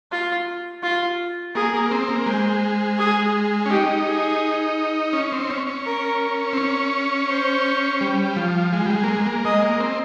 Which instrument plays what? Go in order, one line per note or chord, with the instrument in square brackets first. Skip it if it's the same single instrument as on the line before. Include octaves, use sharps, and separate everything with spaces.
[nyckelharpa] F4
F4
[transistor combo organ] A#3 [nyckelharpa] G#4
[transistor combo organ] A#3
C4
A#3
[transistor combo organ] G#3 [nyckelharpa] C5
[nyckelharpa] G#4
[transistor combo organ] C#4
[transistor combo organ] D#4 [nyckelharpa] G4
[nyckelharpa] G#4
[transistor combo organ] C#4
C4
C#4
C#4
[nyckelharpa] A#4
[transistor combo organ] C4
C#4
[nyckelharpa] C5
[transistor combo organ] G3
F3
G#3
G3
G#3
A#3
G#3
A#3
[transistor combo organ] G#3 [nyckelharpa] D#5
[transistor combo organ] A#3
C4